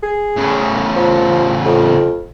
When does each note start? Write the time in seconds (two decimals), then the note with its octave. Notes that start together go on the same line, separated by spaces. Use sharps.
0.03 G#4
0.37 A2 C#3
0.96 F3
1.65 F2